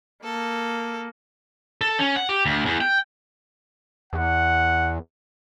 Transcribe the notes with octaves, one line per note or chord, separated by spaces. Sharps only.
A#3 A4
A4
C#4
F#5
G4
D2
E2
G5
E2 F#5